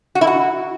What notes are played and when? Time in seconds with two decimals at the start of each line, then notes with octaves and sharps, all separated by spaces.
0.15 F#4
0.21 E4
0.27 F#4